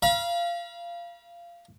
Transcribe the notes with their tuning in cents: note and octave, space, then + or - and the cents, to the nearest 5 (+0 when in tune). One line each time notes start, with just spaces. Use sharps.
F5 -20 B5 -45